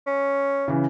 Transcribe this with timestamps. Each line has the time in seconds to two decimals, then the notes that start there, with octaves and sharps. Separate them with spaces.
0.06 C#4
0.68 C#3 E3